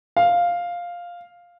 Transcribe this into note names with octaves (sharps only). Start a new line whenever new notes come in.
F5